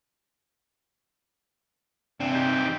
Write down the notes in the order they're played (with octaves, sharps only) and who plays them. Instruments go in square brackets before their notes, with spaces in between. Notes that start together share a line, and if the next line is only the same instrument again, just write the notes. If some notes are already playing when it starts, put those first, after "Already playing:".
[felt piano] C3 [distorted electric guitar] E3 C4 [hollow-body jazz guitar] D4
[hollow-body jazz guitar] D#4 [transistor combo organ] G4